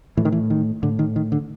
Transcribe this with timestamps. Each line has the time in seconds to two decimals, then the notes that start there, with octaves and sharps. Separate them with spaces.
0.17 A2 E3
0.25 D#3
0.32 E3
0.50 D#3
0.83 A2 D3
0.99 D#3
1.16 D#3
1.32 D3